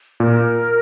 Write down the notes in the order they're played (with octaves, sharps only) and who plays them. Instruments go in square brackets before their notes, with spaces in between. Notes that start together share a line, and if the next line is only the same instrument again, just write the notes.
[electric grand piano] A#2 [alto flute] A#4